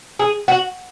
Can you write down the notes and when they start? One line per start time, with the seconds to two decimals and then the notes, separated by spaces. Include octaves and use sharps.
0.19 G#4
0.48 F#4